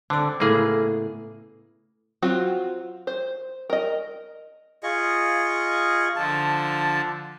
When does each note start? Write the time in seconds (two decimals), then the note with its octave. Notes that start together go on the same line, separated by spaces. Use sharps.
0.10 D3 C4 D5
0.40 A2 C#3 A#3 B3 G#4
2.22 F#3 C4 F4 F#4
3.07 C5
3.70 A#4 D#5
4.83 F4 G#4 D#5 C#6
6.16 D3 F3 A5